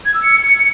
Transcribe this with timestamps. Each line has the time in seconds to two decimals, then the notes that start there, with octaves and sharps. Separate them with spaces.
0.05 G#6
0.14 E6
0.23 C#7